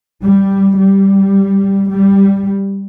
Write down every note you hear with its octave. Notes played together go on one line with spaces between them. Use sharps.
G3
G3
G3